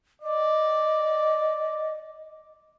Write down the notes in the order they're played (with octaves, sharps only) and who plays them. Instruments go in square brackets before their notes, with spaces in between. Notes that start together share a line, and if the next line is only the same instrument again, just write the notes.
[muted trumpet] D5 [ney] D#5